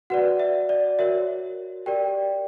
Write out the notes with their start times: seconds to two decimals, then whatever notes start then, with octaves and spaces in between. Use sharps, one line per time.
0.10 F#4 B4 D5 F#5
0.39 E5
0.69 D5
0.99 F#4 A#4 C#5 E5
1.86 G4 A#4 D5 G5